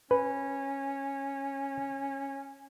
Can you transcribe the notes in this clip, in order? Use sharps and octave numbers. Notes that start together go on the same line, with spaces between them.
C#4 B4